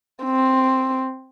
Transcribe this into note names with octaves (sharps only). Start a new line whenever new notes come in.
C4